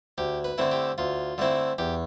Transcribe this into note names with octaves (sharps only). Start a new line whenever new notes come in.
D2 G4
B4
D3 A3 C4 E4
G4
D2 F4
D3 A3 C4 E4
E2 G4